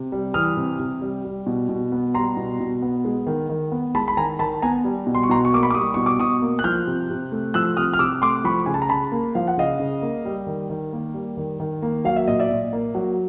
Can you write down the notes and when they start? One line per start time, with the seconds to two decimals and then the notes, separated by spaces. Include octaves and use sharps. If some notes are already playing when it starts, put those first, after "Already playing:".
Already playing: C3
0.12 G3
0.34 E3 D#6 F6
0.57 C3
0.80 C3
1.02 G3
1.25 G3
1.47 B2
1.69 B2
1.92 B3
2.14 G3 A#5 C6
2.37 B2
2.60 B2
2.82 B3
3.05 G#3
3.27 D#3
3.49 D#3
3.72 B3
3.95 G#3 A5 B5
4.08 B5
4.17 D#3 G#5 A#5
4.39 D#3 A5 B5
4.62 B3 G#5 A#5
4.84 G3
5.07 B2
5.15 C6
5.23 C#6
5.29 B2 A#5 C6
5.45 C#6
5.53 A#3 D6
5.63 B5 C#6
5.71 D6
5.74 G3 C#6 D#6
5.94 B2 C#6
6.06 D6
6.19 B2 C#6 D#6
6.42 A#3
6.59 F#6
6.64 F3 F6 G6
6.87 C3
7.10 C3
7.32 A3
7.54 F3 E6 F#6
7.77 C3 D#6 F6
7.93 F6
7.99 C3 D6 E6
8.22 A3 C6 D6
8.44 F3 B5 C#6
8.66 C#3 G#5
8.74 A5
8.82 A#5
8.89 C#3 A5 B5
9.12 A#3
9.35 F3 F5
9.47 F#5
9.57 C#3 D#5 F5
9.79 C#3
10.02 A#3
10.25 G3
10.47 D#3
10.70 D#3
10.93 A#3
11.14 G3
11.37 D#3
11.60 D#3
11.82 A#3
12.05 F#3 F5
12.16 E5
12.27 A#2 D#5
12.39 D5 E5
12.50 A#2
12.73 A#3
12.95 F#3